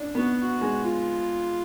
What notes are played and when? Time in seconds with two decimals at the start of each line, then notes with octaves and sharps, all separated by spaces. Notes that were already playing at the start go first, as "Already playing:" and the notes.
Already playing: D4
0.15 B3
0.17 F#4
0.41 F#4
0.61 G#3
0.84 F4